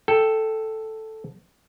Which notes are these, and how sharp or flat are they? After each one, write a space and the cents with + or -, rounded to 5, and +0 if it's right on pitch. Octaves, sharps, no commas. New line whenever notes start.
A4 +0 G5 +0